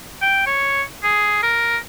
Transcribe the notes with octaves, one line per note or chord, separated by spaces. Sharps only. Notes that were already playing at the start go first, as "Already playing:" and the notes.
G5
C#5
G#4
A#4